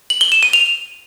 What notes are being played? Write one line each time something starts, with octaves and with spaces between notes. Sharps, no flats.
F#7
G7
E7
D#7
F7